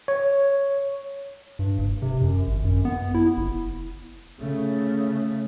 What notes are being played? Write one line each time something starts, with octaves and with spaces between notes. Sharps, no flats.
C#5
G2
F#1
C3
F#2
G#1
F#2
B3
E4
F#1
C#3 A3